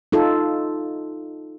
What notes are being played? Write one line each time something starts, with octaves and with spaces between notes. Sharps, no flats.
D#4 F4 A4